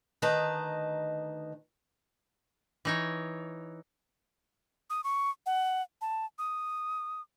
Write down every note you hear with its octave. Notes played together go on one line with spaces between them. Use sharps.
D2 D#3 B4 D#5 A5 A#5
E3 D#4 C#5
D#6
C#6
F#5
A5
D#6